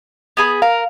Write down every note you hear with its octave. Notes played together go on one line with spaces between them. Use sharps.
B3 G#4 B5
A#4 F5